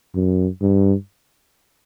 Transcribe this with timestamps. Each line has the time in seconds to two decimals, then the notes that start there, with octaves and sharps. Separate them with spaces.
0.15 F#2
0.62 G2